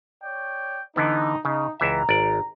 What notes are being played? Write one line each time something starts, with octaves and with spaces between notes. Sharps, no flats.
C#5 D5 G5
D3 E3 B3 D#4
C#3 D#4
C#2 E3 E5 A#5
G#1 D5